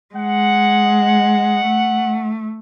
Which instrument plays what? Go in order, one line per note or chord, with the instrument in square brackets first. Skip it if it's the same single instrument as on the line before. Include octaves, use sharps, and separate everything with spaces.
[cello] G#3 [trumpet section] F#5
[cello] A3